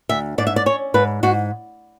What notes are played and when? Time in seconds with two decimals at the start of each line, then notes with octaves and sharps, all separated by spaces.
0.09 D2 E5
0.38 G#2 D5
0.47 E5
0.56 D5
0.66 C#4 C#5
0.94 G#2 B4
1.23 G#2 F#4